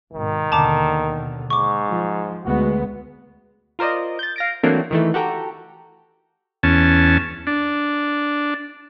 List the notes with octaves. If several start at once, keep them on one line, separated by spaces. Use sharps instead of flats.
G#1 B2 D#3
D#2 B2 D3 A5 A#5 D6
G#2 C#6 D6
F3
D2 G#3 B3 F#4
F4 A#4 C5 D5 D#5
G6 A6
F5 A#6 D7
E3 F#3 A3 A#3 C4 D4
D#3 E3 A3
F#4 G4 A4 G5 A#5
E2 C#4 A5
D4